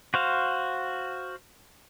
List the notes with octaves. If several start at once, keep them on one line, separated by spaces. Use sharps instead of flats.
F#4 C5 F5